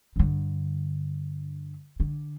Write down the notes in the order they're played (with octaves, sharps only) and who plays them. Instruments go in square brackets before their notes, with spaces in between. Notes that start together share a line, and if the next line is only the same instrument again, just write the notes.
[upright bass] G2 D3
D3